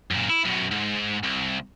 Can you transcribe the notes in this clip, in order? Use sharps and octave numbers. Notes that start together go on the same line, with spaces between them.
F#2 A#2
E4
F#2 B2
G#2
C2